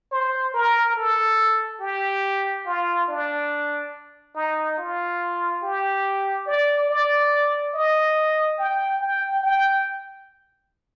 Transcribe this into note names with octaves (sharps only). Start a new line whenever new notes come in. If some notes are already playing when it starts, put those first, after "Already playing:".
C5
A#4
A4
G4
F4
D4
D#4
F4
G4
D5
D5
D#5
G5
G5
G5